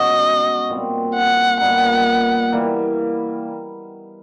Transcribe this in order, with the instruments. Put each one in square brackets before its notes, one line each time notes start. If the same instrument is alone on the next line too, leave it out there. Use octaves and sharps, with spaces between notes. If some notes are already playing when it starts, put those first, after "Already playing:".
Already playing: [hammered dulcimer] B2 G#3 C#4 F#4 [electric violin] D#5
[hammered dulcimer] A#2 G3 C4
[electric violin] F#5
[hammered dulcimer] A#2 G3 B3 D#4 [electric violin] F#5
[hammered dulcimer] E3 G3 A#3